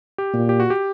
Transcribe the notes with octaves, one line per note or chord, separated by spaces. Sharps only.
G4
A#2
G4
F#4
G4